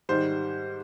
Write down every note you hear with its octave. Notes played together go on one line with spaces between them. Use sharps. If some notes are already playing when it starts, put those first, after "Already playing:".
G#2 D#3 G3 C5